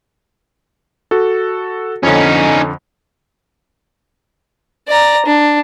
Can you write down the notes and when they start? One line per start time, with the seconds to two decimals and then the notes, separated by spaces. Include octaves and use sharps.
1.11 F#4 A4
2.03 F2 D3 C#4 D#4
4.88 D5 A#5
5.25 D4